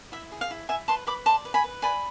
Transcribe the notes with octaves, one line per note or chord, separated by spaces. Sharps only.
E4 E5
G#4
F5
E4
E4 E5 G#5
B4 A5 C6
B4 B5 D6
D5 A5 C6
B4
G#5 B5
B4
D5 G#5 B5